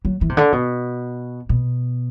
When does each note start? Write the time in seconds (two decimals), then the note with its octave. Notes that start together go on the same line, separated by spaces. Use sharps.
0.05 F#3
0.21 E3
0.29 C3
0.37 D3
0.53 B2
1.49 B2